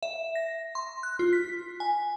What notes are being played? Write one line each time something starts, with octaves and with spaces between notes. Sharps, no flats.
E5
A#6
C6
F#6
F4
B6
G#5